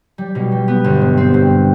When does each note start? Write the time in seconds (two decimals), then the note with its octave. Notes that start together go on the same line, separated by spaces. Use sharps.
0.18 G3
0.35 B2
0.52 G3
0.68 B3
0.84 G1
1.01 G2
1.17 C4
1.34 G2